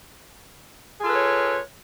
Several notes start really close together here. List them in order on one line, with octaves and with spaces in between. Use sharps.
G#4 F4 A4 B4 C#5